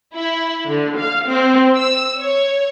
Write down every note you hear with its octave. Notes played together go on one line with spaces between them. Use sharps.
E4
D3
F5
C4
E6
C#5